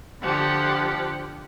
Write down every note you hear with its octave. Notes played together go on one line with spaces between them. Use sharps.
D3 F3 G4 F#5